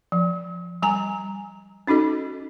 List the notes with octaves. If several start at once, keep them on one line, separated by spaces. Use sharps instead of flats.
F3
G3 G#5 A#5
C#4 D#4 F#4 A4 D#5